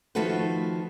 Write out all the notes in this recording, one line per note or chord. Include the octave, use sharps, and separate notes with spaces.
D#3 F3 A3 F#4 A4 B4